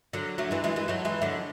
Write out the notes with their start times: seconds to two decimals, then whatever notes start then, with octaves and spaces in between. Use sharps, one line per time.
0.13 D3 F#3
0.38 F#3 A3
0.51 E3 G#3
0.64 E3 G#3
0.76 E3 G#3
0.88 F#3 A3
1.05 E3 G#3
1.22 D3 F#3